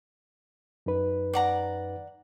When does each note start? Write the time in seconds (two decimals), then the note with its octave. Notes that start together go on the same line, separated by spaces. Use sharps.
0.86 F#2 D#4 B4
1.33 D5 F#5 A#5